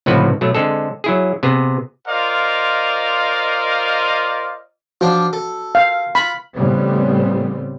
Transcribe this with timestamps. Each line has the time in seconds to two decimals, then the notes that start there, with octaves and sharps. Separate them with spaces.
0.06 C#2 A2 C3 F3 F#4 B4
0.41 B2 F#3 A3
0.55 D3 G#3 C4 A4
1.04 F#3 E4 G#4
1.43 C3 B3 G#4
2.08 F4 A#4 C5 D5 D#5 F5
5.01 F3 D4 F#4
5.33 A4
5.75 F5
6.15 F4 B5
6.53 A1 C#3 G3 B3 C4